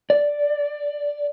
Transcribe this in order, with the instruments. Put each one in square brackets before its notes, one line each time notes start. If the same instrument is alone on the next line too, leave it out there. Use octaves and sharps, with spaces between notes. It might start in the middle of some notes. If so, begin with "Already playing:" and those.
[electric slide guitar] D5